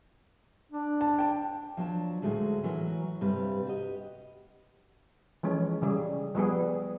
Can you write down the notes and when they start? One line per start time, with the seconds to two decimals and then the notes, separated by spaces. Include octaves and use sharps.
0.72 D4
1.01 A5
1.19 G5 A5
1.77 F3 F#3 D4 A5
2.22 D2 A2 G#3 F#4
2.63 E3 F#3 F#4 A#4
3.21 G2 C3 G3 B4
3.67 F#4 G4 D#5
5.43 E3 F3 G#3 C#4
5.82 C#3 G3 G#4
6.35 F3 G3 B3 G#4